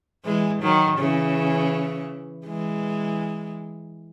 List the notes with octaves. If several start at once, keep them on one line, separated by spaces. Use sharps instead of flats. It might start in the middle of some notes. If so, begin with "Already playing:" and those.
E3 G#3
D#3 F#3
C#3 E3
E3 G#3